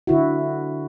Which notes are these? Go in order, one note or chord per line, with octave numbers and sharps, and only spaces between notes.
D3 E4 F#4